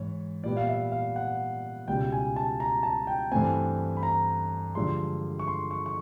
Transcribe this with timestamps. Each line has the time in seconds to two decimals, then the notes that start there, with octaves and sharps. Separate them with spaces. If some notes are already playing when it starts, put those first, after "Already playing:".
Already playing: G#2 E3 C#5
0.44 A#2 G3 B3 D5
0.57 F5
0.69 E5
0.92 F5
1.16 F#5
1.88 C#2 B2 G3 G5
2.12 G#5
2.36 A5
2.60 A#5
2.83 A5
3.07 G5
3.32 G2 E3 A3 C4 G#5
3.97 B5
4.03 A#5
4.75 G2 D3 F3 G#3 C6
5.39 C#6
5.48 C6
5.71 C#6
5.86 C#6